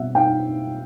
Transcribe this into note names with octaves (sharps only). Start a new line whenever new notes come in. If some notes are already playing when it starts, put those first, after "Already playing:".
Already playing: B2 G3 C4 E5 F#5
D#4 F5 G5